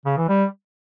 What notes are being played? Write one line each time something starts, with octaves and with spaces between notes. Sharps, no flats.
C#3
E3
G3